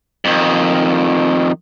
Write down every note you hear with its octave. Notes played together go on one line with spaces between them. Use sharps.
F2 D#3